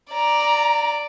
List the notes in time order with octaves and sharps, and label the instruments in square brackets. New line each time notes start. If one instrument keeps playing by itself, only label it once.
[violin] D5 [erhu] A#5